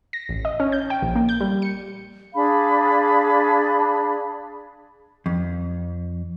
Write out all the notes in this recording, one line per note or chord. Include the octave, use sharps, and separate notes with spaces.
A#6
A1
D#5
C#4
G6
G5
A#1
A#3
G6
G3
C#7
D4 G#4 F5 B5
F2